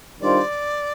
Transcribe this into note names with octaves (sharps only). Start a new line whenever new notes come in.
D#3 G3 D4 F4 C5 D5